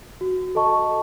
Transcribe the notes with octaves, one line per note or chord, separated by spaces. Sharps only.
F#4
A4 D#5 A5 C#6